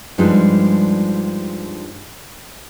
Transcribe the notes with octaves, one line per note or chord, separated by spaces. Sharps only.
G2 F3 G3 G#3 D4 D#4